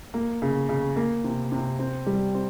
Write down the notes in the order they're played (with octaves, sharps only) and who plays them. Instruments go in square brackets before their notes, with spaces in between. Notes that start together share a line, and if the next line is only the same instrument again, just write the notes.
[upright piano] A#3
C#3
C#3
A#3
C3
C3
C4
G3
C4